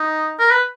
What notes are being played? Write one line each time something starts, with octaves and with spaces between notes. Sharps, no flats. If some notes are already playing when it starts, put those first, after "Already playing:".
Already playing: D#4
A#4
B4